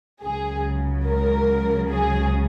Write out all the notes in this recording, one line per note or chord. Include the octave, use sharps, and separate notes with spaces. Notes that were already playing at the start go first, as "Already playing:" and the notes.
C#2 C#3 F#3 G#4
A#4
G#4